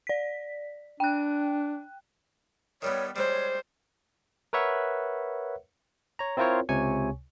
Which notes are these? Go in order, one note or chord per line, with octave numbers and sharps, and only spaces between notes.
D5 B6
D4 G5 F#6
D#3 G3 B3 C#5
G3 G#3 C5 C#5
A#4 B4 C#5 E5 F#5
C#5 A#5
C4 E4 F4 A#4 C5 C#5
C#2 C3 C#5 G#5 C#6